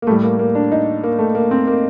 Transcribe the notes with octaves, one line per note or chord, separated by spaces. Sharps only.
A#3
A2 G3 A3
A#3
A#3
D4
D#4
A#3
A3
A#3
C4
A#3